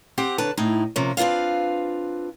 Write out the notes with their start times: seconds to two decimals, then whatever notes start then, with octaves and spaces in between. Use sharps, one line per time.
0.18 C4 G4 F#5
0.38 D3 F#3 B4 A5
0.57 A2 D#4 E4
0.96 C3 F3 A#3 C#4
1.17 C4 D4 F4 B4 F5